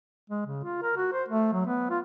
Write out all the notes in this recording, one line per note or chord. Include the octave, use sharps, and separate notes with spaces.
G#3
C#3
F4
A#4
F#4
C5
A3
F#3
B3
F4